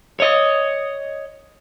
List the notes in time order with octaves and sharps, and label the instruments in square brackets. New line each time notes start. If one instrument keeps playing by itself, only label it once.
[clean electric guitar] C#5 D#5